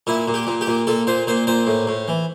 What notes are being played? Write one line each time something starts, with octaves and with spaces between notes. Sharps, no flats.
A#2 E4
A#2
G4
A#2
G4
A#2
A#2 A4
A#2 C5
A#2 C5
A#2 C5
A2
A2
E3